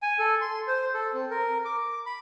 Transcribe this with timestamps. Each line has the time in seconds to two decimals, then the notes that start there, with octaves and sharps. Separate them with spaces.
0.02 G#5
0.19 A4
0.41 C6
0.68 C5
0.94 A4
1.13 C4
1.30 A#4
1.65 D6
2.06 B5